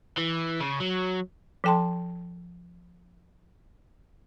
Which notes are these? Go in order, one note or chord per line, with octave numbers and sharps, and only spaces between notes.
E3
C#3
F#3
F3 A4 G5 A5 C6